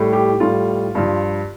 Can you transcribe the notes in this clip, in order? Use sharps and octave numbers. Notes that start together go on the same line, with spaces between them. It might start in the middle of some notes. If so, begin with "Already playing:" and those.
Already playing: A2 G3
G4
A2 G3 F4
G2 F3